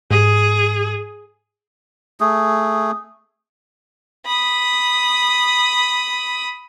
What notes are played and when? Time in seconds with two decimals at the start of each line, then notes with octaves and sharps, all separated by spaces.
0.11 G#2 G#4
2.20 A3 G#4
4.26 B5 D#6